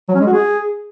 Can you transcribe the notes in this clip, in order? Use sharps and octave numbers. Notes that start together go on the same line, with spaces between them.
F#3
C#4
G#3
F#4
G#4